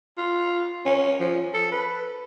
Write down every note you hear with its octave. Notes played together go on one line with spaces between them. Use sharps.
F4
C#4
F3
A4
B4